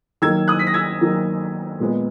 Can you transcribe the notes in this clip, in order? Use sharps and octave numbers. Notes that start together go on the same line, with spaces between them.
D#3 F#3 A#3 E6 G#6
D#6 F#6
B6
A#6
E6 G#6
D#3 F#3 A#3
A#2 G#3 B3